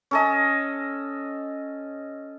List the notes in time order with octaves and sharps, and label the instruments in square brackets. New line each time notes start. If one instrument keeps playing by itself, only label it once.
[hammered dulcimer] C#4 A4 D#5